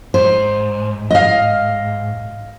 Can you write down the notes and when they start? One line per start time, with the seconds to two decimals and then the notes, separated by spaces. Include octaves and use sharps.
0.14 G#2 C5
1.11 D#5 F5